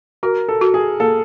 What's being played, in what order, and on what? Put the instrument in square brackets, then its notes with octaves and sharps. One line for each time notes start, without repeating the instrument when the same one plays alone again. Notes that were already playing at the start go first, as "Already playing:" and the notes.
[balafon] F#4 [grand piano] A#4
[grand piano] A4
[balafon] F#4
[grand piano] G#4
[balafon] A#3 [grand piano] A4